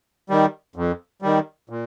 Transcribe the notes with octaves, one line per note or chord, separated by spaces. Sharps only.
D#3 G3
F2
D#3 G3
A#2